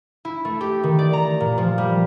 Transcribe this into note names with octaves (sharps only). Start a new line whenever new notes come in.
E4
A3
G4
D#3
D5
A#5
A#2
F3
G3